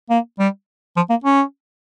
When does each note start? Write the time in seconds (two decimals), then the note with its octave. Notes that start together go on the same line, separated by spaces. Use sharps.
0.10 A#3
0.39 G3
0.96 F3
1.10 A#3
1.24 C#4